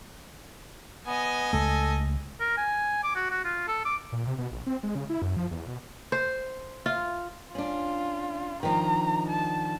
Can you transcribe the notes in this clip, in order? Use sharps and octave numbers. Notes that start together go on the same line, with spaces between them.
B3 D#5 G#5
C#2 A3 A4
A#4
G#5
D6
F#4
F#4
F4
A4
D6
A#2
C3
B2
A#1
C4
G#3
C#3
E4
F#2
F3
E2
B2
C5
F4
C#4 D4 F4
D#3 F3 D4 A#5
A5